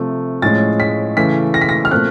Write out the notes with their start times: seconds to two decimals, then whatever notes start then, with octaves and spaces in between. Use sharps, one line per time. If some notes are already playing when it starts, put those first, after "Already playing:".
Already playing: C3 F3 A3 C4
0.42 A2 F3 G#3 C#4 A6
0.80 B6
1.17 C#3 E3 A3 B6
1.54 A#6
1.61 B6
1.69 A#6
1.85 F6
1.91 A#2 F3 A3 C4 F#6